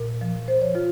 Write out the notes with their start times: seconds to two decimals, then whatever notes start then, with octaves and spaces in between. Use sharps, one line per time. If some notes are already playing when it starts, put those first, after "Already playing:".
Already playing: A#2 A#4
0.21 F3
0.48 F3 C5
0.62 C#5
0.75 F3 F4